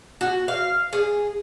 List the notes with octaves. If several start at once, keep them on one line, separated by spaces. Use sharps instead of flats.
F#4
F5
G#4